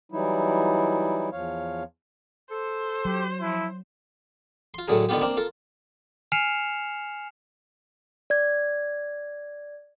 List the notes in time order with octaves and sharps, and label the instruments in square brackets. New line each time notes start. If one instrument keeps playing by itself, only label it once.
[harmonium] E3 F#3 G3 D#4 E4
E2 F3 C#5 F5
[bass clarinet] A4 [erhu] C5
[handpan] F#3 [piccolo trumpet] G4
[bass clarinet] F3 [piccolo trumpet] E4
[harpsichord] F4 C6
A2 D3 F#3 G#4 A#4
D3 D#3 B3 F4 G4
A#3 C4 D4 A#4
F4 A4 A#4
[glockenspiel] G#5 F6 C7 C#7 E7 F7
[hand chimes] D5 G#6